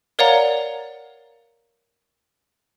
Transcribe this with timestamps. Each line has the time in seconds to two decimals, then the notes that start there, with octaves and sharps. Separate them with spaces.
0.19 A#4 C#5 D5 F5 F#5 A#5